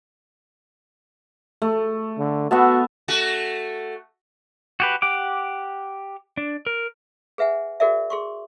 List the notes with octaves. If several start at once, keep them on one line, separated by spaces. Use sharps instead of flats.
A3
D3
B3 F#4 E5 A5
A3 F#4
F#4 G4 B4
G4 F#5 D6
D4
A#4
G#4 B4 E5 F#5 G#5
F#4 G#4 A#4 D5 E5
G#4 C6 C#6